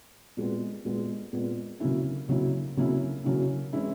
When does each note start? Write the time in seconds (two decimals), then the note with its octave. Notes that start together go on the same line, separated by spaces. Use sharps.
0.37 A#2 G#3 B3
0.85 A#2 G#3 B3
1.33 A#2 G#3 B3
1.80 C#3 F#3 A#3 C#4 E4
2.29 C#3 F#3 A#3 C#4 E4
2.77 C#3 F#3 A#3 C#4 E4
3.24 C#3 F#3 A#3 C#4 E4
3.73 E3 G#3 C#4 E4